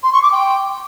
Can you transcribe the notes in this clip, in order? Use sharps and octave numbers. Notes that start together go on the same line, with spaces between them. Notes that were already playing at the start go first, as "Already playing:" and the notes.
C6
C#6
D6
G5